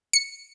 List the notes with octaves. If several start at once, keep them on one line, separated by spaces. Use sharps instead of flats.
C#7